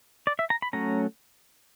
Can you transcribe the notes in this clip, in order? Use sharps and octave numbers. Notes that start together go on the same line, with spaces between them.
D5
E5
A#5
B5
F#3 A3 C#4 A#5